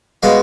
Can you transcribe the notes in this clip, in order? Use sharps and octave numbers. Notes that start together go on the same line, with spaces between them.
B2 G#3 F5